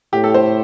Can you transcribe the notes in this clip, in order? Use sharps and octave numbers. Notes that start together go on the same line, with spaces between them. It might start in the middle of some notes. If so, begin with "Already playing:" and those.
A2 G4
A4
C5